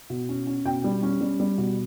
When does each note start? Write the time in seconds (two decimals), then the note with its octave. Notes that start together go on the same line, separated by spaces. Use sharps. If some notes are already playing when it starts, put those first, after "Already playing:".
0.10 B2
0.29 C#4
0.47 C#4
0.65 B2 G5
0.84 G3
1.03 C#4
1.21 G3
1.40 G3
1.58 B2